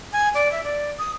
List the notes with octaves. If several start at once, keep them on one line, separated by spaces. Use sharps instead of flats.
G#5
D5
E5
D5
D#6